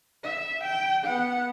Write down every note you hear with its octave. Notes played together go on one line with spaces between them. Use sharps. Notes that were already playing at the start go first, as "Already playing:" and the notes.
E5
G5
B3 F#5